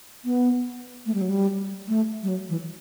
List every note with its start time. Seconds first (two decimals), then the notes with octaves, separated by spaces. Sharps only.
0.25 B3
1.06 A3
1.14 G3
1.21 F#3
1.29 G3
1.88 A3
2.23 G3
2.28 F#3
2.49 E3